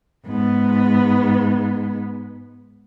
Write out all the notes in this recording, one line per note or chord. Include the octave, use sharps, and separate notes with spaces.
G#2 B3